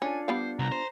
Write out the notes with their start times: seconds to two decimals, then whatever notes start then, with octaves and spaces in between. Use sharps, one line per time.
0.02 C#4 D4 F4 A4 G#5
0.28 G3 B3 C5 F5
0.59 C2 A#5
0.72 C5